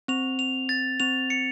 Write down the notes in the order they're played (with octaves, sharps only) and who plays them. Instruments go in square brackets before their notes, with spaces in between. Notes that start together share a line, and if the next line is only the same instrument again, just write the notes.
[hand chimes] C4 [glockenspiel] F7
[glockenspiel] F7
A6
[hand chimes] C4 [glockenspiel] F7
[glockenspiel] C#7